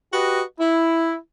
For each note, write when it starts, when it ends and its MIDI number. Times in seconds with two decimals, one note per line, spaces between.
0.13 0.41 66
0.13 0.41 67
0.13 0.41 71
0.13 0.41 75
0.60 1.14 64